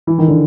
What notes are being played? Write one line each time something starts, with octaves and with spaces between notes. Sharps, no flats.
E3
D#3
D3